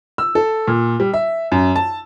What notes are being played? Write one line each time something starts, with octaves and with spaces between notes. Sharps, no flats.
E6
A4
A#2
G3
E5
F#2
A5